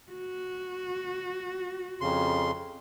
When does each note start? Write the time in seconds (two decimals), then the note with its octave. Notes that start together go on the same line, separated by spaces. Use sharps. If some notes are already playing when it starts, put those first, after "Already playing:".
0.11 F#4
2.01 F2 C#3 C6